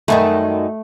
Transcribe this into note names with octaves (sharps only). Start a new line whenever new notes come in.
F#2 D#3 G3 A3